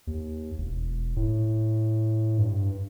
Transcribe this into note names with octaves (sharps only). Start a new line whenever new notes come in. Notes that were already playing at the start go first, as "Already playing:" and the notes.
D#2
E1
A2
G2